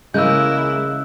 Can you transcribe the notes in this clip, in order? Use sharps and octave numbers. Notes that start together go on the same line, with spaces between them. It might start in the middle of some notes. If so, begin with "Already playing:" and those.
C#3 E3 G#3 A#3 E4 E6 F#6 G6